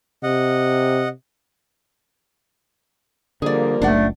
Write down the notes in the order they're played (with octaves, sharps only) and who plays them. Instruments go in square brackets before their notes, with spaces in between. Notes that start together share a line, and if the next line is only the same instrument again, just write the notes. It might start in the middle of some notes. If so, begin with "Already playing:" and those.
[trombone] C3 [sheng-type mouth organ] D#5 F#5
[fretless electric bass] D3 [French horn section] F3 G3 A#3 [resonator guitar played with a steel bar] G#4 D5
[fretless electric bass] F#1 C#2 [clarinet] A3 [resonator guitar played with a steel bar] D4 D5 F#5